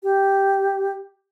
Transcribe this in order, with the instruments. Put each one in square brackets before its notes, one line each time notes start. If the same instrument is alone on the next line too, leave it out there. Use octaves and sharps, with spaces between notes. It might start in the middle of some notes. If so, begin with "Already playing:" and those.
[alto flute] G4